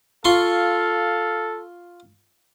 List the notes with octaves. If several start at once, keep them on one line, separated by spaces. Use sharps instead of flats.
F4 A4 F5 C6 C#6